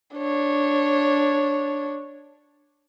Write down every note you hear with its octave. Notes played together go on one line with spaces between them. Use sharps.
D4 C#5